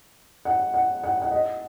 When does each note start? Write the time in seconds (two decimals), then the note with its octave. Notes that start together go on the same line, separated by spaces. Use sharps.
0.45 F#5
0.74 F#5
1.04 F#5
1.22 F#5
1.31 D#5